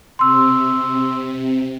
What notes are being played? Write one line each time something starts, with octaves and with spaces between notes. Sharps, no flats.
C3 C6 E6